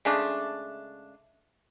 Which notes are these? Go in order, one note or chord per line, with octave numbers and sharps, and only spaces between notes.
C#3 G#3 A3 D4